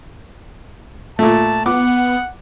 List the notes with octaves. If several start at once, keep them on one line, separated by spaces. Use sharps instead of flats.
A#2 A3 A5
B3 F#5 D6